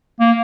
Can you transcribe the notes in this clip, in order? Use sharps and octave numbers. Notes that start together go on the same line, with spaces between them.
A#3